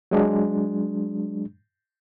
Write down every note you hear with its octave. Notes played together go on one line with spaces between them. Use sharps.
F#3 G#3 D4